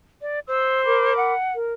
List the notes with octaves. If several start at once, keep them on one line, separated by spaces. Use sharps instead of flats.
D5
C5 E6
A#4 B5 D6
F#5
A#4